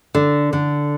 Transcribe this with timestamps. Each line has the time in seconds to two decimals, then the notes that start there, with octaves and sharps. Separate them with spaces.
0.14 D3
0.53 D3